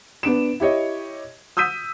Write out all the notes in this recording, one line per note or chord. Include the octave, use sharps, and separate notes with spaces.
B3 D4 D7 E7
E4 G4 C#5 D#5
D#6 E6 G6 B6 D#7